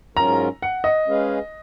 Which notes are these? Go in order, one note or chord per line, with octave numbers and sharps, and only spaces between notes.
G#2 F#3 C#4 F4 A#4 A#5
F#5
D#5
G#3 C#4 G#4 B4 F5